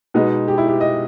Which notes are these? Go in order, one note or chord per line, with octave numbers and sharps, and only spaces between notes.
B2 G#3 B3 D#4
G4
E4
G4
D#5